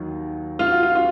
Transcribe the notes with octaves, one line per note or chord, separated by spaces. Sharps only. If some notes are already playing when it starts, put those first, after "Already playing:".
Already playing: D#2 D#3 F#3
F4
F#4
F4
F4